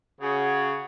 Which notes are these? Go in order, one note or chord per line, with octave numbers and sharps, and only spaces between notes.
C#3 F#4 G#4